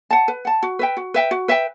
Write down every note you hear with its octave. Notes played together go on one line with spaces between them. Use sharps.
F#5 A5
B4
F#5 A5
F#4
B4 E5 G5
F#4
B4 E5 G5
F#4
B4 E5 G5